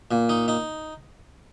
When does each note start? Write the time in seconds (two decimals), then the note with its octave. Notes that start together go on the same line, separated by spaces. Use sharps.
0.11 A#2
0.29 D#4
0.48 D#4